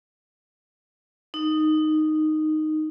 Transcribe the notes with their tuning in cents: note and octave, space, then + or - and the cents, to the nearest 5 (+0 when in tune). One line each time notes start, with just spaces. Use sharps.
D#4 -5